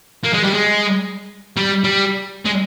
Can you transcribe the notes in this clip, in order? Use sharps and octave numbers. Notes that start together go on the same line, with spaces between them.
A#3
G#3
G3
G#3
G3
G3
G#3